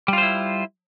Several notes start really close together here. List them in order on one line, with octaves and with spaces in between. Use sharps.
G3 F4 C5 E4